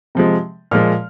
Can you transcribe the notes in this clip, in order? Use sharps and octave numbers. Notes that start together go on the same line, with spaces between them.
C3 F3 G#3
A#2 F3 G#3 F6